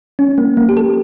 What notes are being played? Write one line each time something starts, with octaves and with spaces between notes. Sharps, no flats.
C#4
A#3
A#3
G4
A4